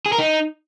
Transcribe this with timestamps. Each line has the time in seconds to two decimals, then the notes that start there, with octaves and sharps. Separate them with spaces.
0.06 G#4
0.12 A#4
0.19 D#4